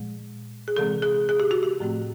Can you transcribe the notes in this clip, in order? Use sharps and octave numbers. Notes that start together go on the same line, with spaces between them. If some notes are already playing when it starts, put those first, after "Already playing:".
Already playing: A#2 F3 G#3
G#4
C3 E3 G#3 C4 A4
G#4
G#4
G4
F#4
G4
A2 F3 A3 C4